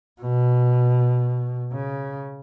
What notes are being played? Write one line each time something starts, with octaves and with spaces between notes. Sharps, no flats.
B2
C#3